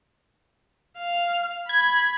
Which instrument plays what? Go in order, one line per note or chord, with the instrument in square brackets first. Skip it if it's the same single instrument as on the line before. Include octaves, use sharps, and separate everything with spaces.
[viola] F5
[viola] B5 [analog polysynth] G#6